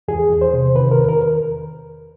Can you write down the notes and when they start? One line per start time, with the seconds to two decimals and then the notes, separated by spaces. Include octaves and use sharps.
0.08 E2 G#4
0.30 E2
0.41 C5
0.54 C3
0.75 D#3 B4
0.91 A#4
0.98 E2
1.09 A#4